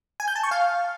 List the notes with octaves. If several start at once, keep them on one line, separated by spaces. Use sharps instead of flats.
G#5
G6
A5
C#6
F5